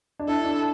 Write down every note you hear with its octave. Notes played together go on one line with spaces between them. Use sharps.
D4
E4 A4
D4